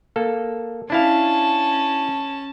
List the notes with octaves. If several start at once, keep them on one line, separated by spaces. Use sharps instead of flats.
A#3 A4
C#4 D4 E4 F5 A5